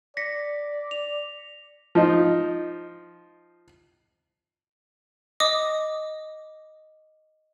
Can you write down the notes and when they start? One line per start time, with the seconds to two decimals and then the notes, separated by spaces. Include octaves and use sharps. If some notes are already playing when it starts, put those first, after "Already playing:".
0.17 D5 A#6 B6 C#7
0.91 F7
1.95 F3 D#4
5.40 D#5 D6 D#6